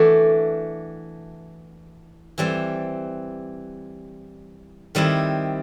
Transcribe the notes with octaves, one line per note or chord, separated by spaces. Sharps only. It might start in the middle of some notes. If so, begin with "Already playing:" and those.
Already playing: E3 A3 D4 F#4
E3 G3 C4
D#3 G3 C4 E4